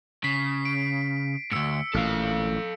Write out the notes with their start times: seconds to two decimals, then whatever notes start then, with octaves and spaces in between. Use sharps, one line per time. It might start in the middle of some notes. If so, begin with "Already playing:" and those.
0.24 C#3 B6 C7
0.65 D7
1.52 D2 G#2 E6 C#7
1.94 A1 A#2 A4 F5